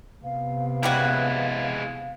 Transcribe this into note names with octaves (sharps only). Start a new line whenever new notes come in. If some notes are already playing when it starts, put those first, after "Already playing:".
C3 B3 F5
C#3 G3 G#3 E4 F#4